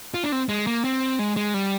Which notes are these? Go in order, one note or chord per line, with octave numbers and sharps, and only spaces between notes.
F4
D4
C4
G#3
A#3
C4
G#3
G#3
G3